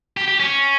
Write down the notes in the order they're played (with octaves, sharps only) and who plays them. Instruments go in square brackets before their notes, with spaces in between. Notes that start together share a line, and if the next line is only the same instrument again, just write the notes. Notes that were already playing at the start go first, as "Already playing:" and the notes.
[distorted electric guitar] G4
G4
C#4